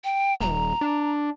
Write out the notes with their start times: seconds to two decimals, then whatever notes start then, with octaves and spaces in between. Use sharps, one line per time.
0.04 G5
0.40 D#1 A#5
0.81 D4